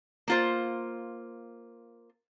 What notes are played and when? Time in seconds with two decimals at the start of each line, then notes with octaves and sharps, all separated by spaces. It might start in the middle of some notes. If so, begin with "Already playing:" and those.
0.28 A#3 F4 C5